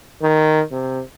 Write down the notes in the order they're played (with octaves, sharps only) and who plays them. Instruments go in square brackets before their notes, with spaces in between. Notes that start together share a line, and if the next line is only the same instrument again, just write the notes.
[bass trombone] D#3
C3